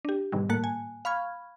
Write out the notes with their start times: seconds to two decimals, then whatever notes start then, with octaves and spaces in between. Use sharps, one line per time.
0.05 D4 G4
0.32 G#2 B2 D#3 G3
0.49 A2 A#3 A5 F#6 C#7
0.64 G#5
1.05 F5 B5 C#6 F6 G#6